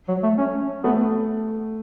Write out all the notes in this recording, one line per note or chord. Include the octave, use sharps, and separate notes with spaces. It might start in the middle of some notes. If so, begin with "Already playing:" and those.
F#3
A3
C#4
A3 B3